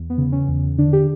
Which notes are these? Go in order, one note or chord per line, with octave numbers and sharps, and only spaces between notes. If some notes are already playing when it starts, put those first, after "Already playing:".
Already playing: E2
B3
C#3
C#4
E2
D3 D4
G4